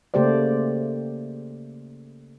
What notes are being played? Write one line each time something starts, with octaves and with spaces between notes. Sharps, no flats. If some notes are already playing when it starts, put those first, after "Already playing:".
C#3 A3 A#3 G4 C5 D5